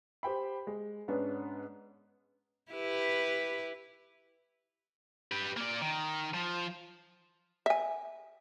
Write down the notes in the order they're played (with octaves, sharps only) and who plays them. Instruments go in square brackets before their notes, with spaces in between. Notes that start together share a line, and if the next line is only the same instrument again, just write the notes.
[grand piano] G4 C5 G5 B5
G#3
G#2 B3 C#4 D4
[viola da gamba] E4 G4 B4
[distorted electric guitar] G4 B4
A#3 D5
D#3
F3
[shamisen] E5 G#5